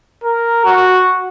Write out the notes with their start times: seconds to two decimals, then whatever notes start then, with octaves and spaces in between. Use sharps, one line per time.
0.24 A#4
0.65 F#4